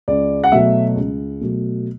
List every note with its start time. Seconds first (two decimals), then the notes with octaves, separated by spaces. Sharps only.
0.08 C#2 D5
0.44 F#5
0.52 B2 F#3 A3 E5
0.96 C#2
1.41 B2 F#3 A3